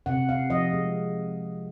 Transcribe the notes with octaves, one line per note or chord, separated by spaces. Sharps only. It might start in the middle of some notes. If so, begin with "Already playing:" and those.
C3 F#5
C3 F5
F3 D#5
G#3